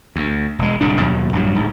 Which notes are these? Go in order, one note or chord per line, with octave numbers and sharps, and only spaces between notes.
D2
E1 G#3
D1 C2 D3 D4
D#2 B2 F#3
A#1 G2 F#3
D1 D2 G#2